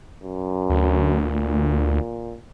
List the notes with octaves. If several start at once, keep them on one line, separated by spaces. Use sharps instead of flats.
F#2
D2
A#2